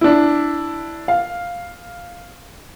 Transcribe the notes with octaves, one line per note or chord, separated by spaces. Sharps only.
D4 E4
F5